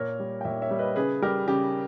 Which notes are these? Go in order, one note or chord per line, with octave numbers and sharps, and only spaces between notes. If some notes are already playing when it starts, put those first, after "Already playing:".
Already playing: A#2 A#4 C#5
G3
G5
A#2 C#5 E5
C#5 E5
G3
B4 D#5
C#3 G#4 B4
G3 G4 A#4
C#3 G4